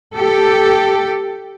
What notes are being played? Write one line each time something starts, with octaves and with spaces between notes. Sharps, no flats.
G4 A4